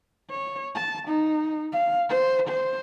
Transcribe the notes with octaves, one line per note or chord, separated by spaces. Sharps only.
C#5
A5
D#4
F5
C5
C5